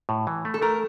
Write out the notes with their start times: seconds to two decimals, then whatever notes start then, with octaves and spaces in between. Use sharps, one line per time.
0.09 A2
0.27 E3
0.45 A3
0.54 A4
0.62 A3 A#4